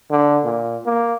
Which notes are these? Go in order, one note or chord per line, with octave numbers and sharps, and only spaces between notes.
D3
A#2
A#3